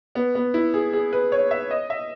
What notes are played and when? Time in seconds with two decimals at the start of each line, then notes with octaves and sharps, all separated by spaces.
0.15 B3
0.35 B3
0.54 E4
0.74 G#4
0.93 G#4
1.13 B4
1.32 C#5
1.51 E5
1.71 D#5
1.90 E5